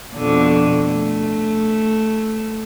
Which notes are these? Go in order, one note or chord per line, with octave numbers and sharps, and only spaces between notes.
F2 B2 D3
A3